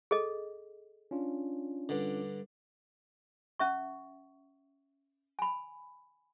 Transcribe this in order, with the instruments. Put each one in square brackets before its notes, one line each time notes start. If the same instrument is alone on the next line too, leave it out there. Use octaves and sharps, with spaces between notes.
[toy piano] G#4 A4 D#5
[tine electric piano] C#4 D4 F4
[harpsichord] G2 D3
[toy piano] C#4 E5 C#6
G#5 B5